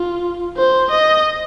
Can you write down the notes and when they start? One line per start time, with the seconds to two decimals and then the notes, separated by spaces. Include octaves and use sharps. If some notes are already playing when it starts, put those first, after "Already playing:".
Already playing: F4
0.57 C5
0.91 D#5